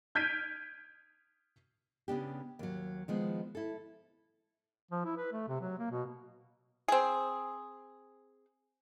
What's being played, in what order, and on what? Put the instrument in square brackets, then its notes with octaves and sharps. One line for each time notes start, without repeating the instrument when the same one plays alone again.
[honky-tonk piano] F6 G6 G#6 B6 D7 D#7
[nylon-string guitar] C#3 B3 D4 G4
D#2 F#3
D#3 F3 G#3 B3
E4 A4
[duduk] F3
E4
B4
A3
C3
F#3
A#3
B2
[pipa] C4 G#4